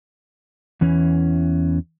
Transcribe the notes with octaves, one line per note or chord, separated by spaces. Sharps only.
E2 E3 C#4